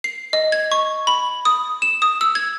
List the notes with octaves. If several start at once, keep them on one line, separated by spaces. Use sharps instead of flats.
C7
D#5
G#6
C#6
B5
D#6
E7
D#6
E6
G#6